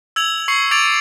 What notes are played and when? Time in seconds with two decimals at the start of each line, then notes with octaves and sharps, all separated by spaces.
0.16 E6 G#6 F7 F#7
0.48 C#6 C7 C#7 F#7
0.71 D6 G#6 A6 D7 F7